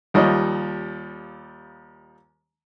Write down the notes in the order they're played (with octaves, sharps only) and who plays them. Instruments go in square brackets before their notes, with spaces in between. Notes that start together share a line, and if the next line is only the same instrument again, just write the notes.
[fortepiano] D#2 F3 G3 C#5 D#5